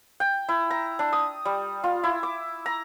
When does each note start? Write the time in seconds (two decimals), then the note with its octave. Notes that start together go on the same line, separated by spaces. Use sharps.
0.20 G5
0.49 E4
0.71 A#5
0.99 D4
1.13 D#6
1.45 G3
1.84 F4
2.03 E4
2.23 D6
2.66 A#5